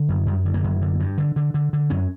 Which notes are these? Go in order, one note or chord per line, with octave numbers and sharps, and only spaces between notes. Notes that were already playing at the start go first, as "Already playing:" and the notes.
Already playing: D3
F#2
F#2 G3
D3
A#3
F#2
D3
G2
D3
D3
D3
D3
F#2 C#4